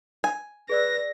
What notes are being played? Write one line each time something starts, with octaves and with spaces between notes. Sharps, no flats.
G#5
G#4 B4 D5 E6 A#6